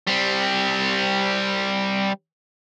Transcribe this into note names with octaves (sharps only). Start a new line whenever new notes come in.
G3 C4